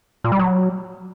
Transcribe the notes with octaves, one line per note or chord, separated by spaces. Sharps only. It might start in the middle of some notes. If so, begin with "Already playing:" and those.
A#2
G3
F#3